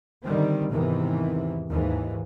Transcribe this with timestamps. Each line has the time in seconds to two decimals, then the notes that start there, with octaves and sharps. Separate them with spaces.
0.23 D3 D#3 G3 C4
0.71 E2 G#2 C3 D#3 E3
1.69 D#2 G#2 E3